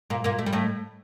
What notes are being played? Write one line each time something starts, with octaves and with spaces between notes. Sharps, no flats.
A#2 A#3
A#2 A#3
A3
G3
A2 A3